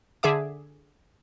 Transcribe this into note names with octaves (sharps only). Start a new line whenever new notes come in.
D3 G#4 E5 D6